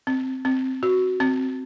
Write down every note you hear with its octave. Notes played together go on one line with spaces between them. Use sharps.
C4
C4
F#4
C4